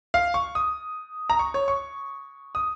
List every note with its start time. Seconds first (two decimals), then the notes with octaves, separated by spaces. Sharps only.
0.14 F5
0.34 C#6
0.55 D#6
1.30 A#5
1.39 C#6
1.54 C#5
1.68 C#6
2.55 D#6